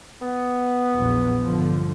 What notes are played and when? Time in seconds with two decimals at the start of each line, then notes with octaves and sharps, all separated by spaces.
0.22 B3
0.94 A#1 E2 F#3
1.44 G1 D3 F3